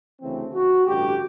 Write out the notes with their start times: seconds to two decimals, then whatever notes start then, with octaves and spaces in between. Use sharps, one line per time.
0.21 D2 C#3 E3 A3 C4
0.54 F#4
0.87 A1 G2 D3 G4